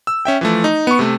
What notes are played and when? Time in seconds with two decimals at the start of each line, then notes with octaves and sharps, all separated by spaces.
0.07 E6
0.25 C#4 E5 G5
0.41 E3 F3 A3
0.64 D#4
0.87 B3 C#6
0.99 C3 A3